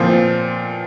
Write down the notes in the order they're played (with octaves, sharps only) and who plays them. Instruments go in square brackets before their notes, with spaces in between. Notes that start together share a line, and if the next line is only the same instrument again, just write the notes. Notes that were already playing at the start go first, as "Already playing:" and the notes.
Already playing: [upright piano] A#2 F3 C4 F4